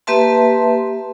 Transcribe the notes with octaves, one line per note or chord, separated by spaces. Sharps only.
A#3 G4 B4 E5 A5 C6